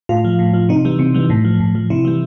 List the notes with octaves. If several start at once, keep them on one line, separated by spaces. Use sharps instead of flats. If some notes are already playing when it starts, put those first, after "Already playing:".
A2 F4
F3
A2
F3
C3 D#4
E3 G3
C3
E3 G3
A2
F3
A2
F3
C3 E4
E3 G3